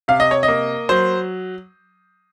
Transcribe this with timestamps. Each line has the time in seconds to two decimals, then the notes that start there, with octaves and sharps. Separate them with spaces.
0.08 C3 F5
0.20 D#5
0.31 C#5
0.43 D#5
0.48 A#3
0.89 F#3 C5